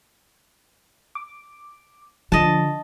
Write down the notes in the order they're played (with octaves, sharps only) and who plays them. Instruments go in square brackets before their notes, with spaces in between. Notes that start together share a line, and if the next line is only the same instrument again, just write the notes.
[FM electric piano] D6
[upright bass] D3 [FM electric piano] F3 [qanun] D#5 A5